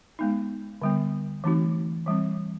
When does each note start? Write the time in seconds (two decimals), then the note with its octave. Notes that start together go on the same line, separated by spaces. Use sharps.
0.19 G#3 B3 D#4
0.82 D3 G3 B3
1.44 E3 A3 C4 D#4 F#4
2.06 E3 G3 C4